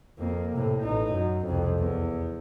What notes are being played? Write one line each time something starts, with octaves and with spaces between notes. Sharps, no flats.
F2 A#3
A2 C3
A1 D#4
F#2
C2 F2
E2